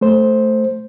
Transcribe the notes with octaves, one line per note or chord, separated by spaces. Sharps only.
A3 C5